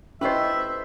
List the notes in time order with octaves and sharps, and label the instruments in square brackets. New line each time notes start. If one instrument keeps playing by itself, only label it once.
[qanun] A3 E4 G4 [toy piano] C#4 D#5 [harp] B4 C5 [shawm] E5